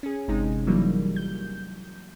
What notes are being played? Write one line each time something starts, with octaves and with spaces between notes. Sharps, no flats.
C#4 G#4
G1 C3 G#3 D#4
E3 F#3 G3 A#3
G6